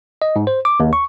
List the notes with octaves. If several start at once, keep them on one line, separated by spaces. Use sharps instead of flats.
D#5
G#2
C5
D6
D#2
C#6